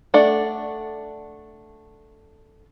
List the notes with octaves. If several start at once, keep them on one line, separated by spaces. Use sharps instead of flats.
A3 D4 A4 D5 F#5